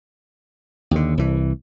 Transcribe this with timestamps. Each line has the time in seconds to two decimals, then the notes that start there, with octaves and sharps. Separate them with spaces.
0.91 D#2 D3
1.17 C2 E3